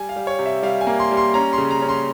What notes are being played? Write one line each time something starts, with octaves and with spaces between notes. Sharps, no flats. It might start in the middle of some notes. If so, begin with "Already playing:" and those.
Already playing: G3 G#5
F5
G3
C#5
C3
E5
G3 F5
G#5
A#3
C6
G3
C6
C#4 A#5
C6
C#3
A#5
C#4
C6